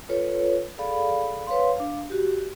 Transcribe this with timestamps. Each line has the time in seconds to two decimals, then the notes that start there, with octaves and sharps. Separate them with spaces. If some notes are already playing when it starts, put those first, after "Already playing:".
0.09 F4 A4 B4 C#5
0.78 G#4 A4 D5 F5 B5
1.47 B4 C#5 F5 C6
1.77 D4 F5
2.10 F#4 G4